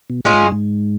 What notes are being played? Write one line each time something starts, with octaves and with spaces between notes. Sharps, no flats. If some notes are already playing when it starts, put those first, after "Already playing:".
B2
A2 G#3 C#4 F4 G#4
G#2
G2
G#2